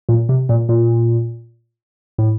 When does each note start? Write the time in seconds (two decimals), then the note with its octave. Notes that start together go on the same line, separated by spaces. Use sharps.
0.09 A#2
0.29 C3
0.49 A#2
0.69 A#2
2.18 A2